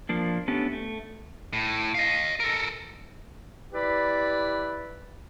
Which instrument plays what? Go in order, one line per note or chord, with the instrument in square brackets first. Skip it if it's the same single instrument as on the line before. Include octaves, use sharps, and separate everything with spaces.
[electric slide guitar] F3 A#3 D4
A3 B3 C#4 D4 G4
A3
[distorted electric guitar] A2
D#5 F5
A4 A#4
[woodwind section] E4 G4 B4 D5 B5